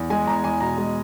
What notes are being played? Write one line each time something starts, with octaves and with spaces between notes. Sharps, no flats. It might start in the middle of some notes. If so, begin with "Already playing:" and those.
Already playing: E2
G#3 G#5
E2 A#5
E2 G#5
B2 A#5
G#3